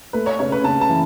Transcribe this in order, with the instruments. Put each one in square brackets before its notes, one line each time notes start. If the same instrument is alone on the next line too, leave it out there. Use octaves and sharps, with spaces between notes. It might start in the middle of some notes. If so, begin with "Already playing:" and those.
[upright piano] A3 [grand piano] B4
[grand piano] C#5
[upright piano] C#3 [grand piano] C#5
[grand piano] B4
[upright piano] C#3 [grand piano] A5
[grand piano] A5
[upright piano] E3